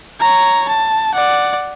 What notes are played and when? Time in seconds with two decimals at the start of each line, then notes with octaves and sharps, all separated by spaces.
0.20 C#5 A#5
0.69 A5
1.14 D5 F#5